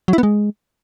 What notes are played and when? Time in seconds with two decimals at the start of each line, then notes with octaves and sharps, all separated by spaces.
0.08 F#3
0.13 E4
0.18 B3
0.23 G#3